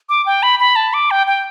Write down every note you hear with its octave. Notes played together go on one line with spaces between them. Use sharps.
D6
G5
B5
B5
A5
D6
G5
G5